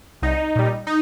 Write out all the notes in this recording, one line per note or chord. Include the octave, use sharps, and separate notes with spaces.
C2 D#4
A#2 G3
D#4